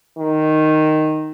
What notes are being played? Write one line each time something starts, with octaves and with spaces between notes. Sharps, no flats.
D#3